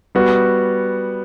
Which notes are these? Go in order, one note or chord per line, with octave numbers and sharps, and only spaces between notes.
G3 B3 F#4